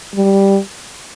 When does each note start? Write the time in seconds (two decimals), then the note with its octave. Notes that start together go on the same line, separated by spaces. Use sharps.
0.15 G3